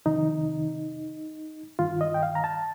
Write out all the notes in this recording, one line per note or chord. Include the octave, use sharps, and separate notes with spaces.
F2 C3 D#3 D#4
G2 D#3 F4
D#5
G5
F5
A#5
A5